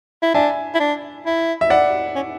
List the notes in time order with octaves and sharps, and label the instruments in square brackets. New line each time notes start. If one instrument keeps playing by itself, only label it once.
[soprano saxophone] E4
[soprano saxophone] D4 [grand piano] E5 G#5
[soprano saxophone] E4
D4
E4
[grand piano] E5
D5 F#5
[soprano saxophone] C#4